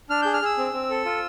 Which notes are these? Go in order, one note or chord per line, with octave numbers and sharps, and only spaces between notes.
D4 F6
G#4 G6
F6
G#4 E6
C4
C4
A4
F4